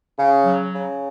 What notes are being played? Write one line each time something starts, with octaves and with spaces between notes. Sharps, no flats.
C#3
F#3
C#3